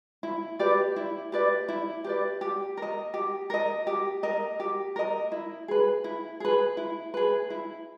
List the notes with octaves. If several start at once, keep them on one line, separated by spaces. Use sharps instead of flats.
E4
G4 B4 D5
E4
G4 B4 D5
E4
G4 B4 D5
G4
A#4 D#5
G4
A#4 D#5
G4
A#4 D#5
G4
A#4 D#5
E4
G#4 B4
E4
G#4 B4
E4
G#4 B4
E4